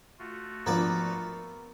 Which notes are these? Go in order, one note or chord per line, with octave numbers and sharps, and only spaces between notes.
A3 F4 F#4
G#2 F3 A#3 B3 D4 D5 A#5